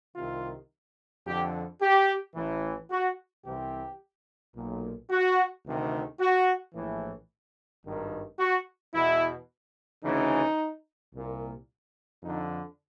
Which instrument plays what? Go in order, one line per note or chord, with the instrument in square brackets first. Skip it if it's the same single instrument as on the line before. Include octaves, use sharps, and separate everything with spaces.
[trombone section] C2 C3 D#3 F4
F2 D3 G4
G4
A1 A2 E3
F#4
C2 C3 E3 G4
B1 A#2
F#4
D2 C3 D#3
F#4
A#1 A2 E3
G#1 G2 D#3
F#4
E2 B2 E4
D2 C#3 E3 D#4
C2 A#2
F2 D3 D#4